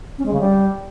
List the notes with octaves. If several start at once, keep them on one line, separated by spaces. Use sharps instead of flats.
C#4
G#3
C#3
G3